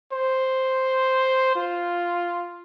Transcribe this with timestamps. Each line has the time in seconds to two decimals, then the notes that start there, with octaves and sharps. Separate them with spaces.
0.13 C5
1.56 F4